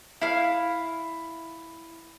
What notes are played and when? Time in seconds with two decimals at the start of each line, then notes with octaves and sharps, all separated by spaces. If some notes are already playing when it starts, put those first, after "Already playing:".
0.21 E4 F5